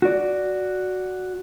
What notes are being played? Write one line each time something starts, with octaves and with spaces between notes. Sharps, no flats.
F#4 D5